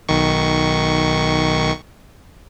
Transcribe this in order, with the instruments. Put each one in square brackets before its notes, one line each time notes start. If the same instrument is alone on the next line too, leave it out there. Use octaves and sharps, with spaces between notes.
[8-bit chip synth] B1 D#3 C#6